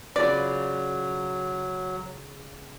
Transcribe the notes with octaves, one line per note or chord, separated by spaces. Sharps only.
C#3 F#3 F4 B4 D5